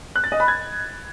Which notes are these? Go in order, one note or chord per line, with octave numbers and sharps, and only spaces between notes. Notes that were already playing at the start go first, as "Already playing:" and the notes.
F#6
A6
D#5
B5
G#6